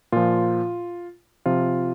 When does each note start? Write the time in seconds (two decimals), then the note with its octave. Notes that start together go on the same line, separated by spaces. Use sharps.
0.12 A#2 F3 F4
1.46 C3 F3 F4